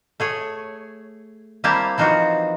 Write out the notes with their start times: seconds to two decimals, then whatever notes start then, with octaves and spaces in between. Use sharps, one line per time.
0.20 A3 G#4 C#5
1.64 G3 A#3 C4 E4 G4 A5
1.98 E3 F3 D#4 F4 F#4